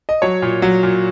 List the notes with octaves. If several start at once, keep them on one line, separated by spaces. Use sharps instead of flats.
D#5
F#3 C#5
A#2
F#3
A#2